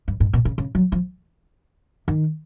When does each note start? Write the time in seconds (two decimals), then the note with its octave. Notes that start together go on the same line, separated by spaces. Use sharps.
0.08 G2
0.20 G#2
0.33 B2
0.45 C#3
0.58 C#3
0.75 F#3
0.92 F3
2.08 D#3